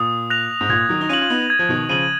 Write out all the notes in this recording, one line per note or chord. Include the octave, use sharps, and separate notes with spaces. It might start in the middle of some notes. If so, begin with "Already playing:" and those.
Already playing: A#2 D#6
F#6 A#6 F7
G#2
A#2 G#6
D#3 F#3
D#4
C#4 F4 D#7 F#7
F4
B3 D#4
G#6
F3
B2 D#3
C#3 F3 D#7 F#7